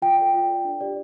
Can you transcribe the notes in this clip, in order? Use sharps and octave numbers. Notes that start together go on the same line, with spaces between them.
F4 G5
A4 D5
F4
A4
D5
D4
G4 D5